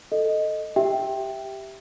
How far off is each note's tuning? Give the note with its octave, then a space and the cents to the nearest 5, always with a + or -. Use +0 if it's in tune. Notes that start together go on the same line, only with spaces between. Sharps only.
A4 +5 D#5 -5
G4 +0 E5 +0 G5 +0